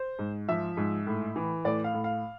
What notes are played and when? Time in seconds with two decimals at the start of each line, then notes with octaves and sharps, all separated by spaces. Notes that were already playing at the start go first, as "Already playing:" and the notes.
Already playing: C5
0.19 G#2
0.49 F3 E5
0.77 G#2
1.07 A2
1.36 E3
1.65 A2 D5
1.84 F5
1.94 A2
2.04 F5